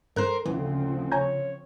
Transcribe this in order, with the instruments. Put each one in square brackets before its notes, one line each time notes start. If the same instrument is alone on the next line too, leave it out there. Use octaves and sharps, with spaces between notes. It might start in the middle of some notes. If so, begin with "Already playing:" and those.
[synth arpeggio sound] G2 F#6 [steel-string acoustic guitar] A#4 C5
[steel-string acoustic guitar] D2 [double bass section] C#3 F3 C4 [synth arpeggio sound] E3
[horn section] C#5 [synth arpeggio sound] G#5 A#5 G6